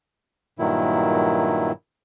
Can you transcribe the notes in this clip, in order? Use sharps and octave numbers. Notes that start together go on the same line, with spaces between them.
G2 A#2 D#3 F#3 E4